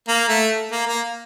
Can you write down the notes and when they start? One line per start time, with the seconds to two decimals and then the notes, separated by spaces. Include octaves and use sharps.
0.08 A#3
0.29 A3
0.72 A#3
0.87 A#3